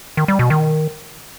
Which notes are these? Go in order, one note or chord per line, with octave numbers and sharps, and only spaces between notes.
D#3
G3
B2
D#3